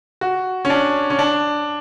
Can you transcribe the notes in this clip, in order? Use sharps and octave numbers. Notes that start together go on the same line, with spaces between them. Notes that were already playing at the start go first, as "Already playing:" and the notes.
F#4
C#4
D4
C#4
D4